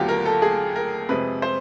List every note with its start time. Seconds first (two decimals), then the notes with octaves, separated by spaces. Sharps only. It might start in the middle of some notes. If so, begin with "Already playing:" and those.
Already playing: D#2 D3 F#3 B3 F4 G4
0.09 A#4
0.26 A4
0.42 G#4
0.76 A#4
1.09 F2 C3 F3 G#3 B4
1.42 C5